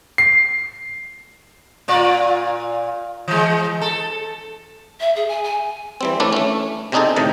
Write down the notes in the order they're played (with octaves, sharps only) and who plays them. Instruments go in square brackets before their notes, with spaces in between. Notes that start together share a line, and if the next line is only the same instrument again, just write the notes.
[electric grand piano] C7
[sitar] A#2 F4 D5
E3 G#3
A4
[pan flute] E5
G#4
G#5
G#5
[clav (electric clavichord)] E3 G3 C4
E3 A3 C#4 D4 E4 D5
A3 C#4
C3 C4 D4 D#4 G#4 A4
A2 C3 D#3 A5